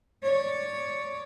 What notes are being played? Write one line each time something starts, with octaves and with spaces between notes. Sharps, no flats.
C#5 D5